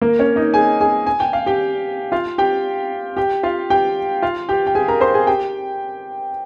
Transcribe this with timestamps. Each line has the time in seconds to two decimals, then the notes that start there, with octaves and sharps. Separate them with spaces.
0.02 A#3 A#4
0.19 C#4 C#5
0.36 D#4 D#5
0.54 G#4 G#5
0.81 G#4 G#5
1.06 G#5
1.20 G5
1.33 F5
1.46 G4 G5
2.12 F4 F5
2.38 G4 G5
3.17 G4 G5
3.43 F4 F5
3.70 G4 G5
4.22 F4 F5
4.49 G4 G5
4.67 G5
4.75 G#4 G#5
4.88 A#4 A#5
5.01 C5 C6
5.14 G#4 G#5
5.27 G4 G5